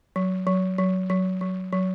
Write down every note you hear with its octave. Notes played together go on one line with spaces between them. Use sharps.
F#3
F#3
F#3
F#3
F#3
F#3